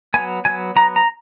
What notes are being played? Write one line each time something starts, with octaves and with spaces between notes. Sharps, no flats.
F#3 B3 G#5
F#3 B3 G#5
F#3 B3 A#5
A#5